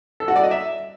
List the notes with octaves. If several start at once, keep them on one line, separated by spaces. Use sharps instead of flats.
A4
F#4
D5
D#5
E5